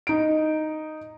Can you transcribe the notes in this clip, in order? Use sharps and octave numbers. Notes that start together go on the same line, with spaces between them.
D#4 D7